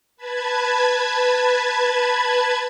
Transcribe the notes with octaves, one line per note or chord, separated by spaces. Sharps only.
B4 A5 B5 G#6